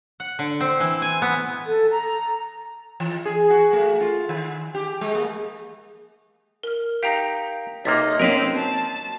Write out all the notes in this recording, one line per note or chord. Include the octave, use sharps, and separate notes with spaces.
F#5
D3
C4
E3
G#5
B3
A4
A#5
E3
G#4
F#4
A3
F4
D#3
G4
G#3
A#3
A#4 F6
D#4 G4 F5 G5 A#5
B1 C3 A#3 D#4 A6 B6
F#3 A#3 C4 C#4 A#4 B4 F5
A5